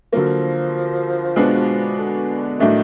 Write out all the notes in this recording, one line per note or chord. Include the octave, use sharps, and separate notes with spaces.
D3 F3 F#3 A#3
B2 G#3 B3 D4 F#4
D3
A2 D#3 F#3 A3 D4